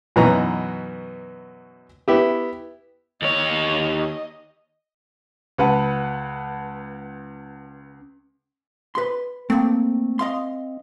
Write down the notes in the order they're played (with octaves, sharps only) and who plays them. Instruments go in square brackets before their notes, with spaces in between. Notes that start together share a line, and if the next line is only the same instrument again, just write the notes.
[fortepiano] F#2 B2 E3 B3 D#4 A#5
B3 E4 G4
[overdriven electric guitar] D#2 C#5 [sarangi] D#5
[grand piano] C#2 B4 F#5 A5
[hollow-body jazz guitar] B4 C6
[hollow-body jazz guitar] A3 A#3 [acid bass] C4
[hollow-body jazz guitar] D#5 F5 C6